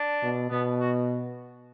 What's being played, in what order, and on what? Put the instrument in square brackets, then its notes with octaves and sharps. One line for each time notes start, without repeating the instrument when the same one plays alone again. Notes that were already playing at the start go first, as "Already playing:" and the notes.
Already playing: [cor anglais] D4
[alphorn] B2
[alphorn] B2 [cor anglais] B3
[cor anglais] F#4